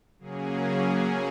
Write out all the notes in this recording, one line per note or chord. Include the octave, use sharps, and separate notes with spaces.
C#3 F#3 A#3 C#4 G#4